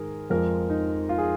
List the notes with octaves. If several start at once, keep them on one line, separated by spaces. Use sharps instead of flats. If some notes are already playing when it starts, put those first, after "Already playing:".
Already playing: G#2 D#3 G#3 G#4 A#4
F2 F3 G#3 A#4
D#4
F4
G#4